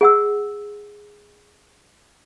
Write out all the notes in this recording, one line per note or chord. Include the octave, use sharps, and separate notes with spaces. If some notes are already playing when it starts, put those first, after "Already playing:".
G#4 F#5 E6